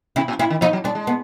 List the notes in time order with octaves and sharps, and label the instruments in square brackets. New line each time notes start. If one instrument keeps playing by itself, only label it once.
[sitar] C3 [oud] E4
[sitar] A#2
[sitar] A2 [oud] E4
[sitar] D#3
[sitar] F3 [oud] D#4
[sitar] F#3
[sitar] G3 [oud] D4
[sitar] G#3
[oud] B3